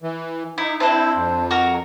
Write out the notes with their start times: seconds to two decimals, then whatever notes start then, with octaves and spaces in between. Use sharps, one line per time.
0.02 E3
0.58 D#4 E4
0.80 C4 D4 E4 C5
1.16 F2
1.51 F#4 A#4